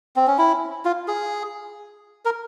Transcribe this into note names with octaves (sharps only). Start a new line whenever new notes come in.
C4
C#4
E4
F4
G#4
A#4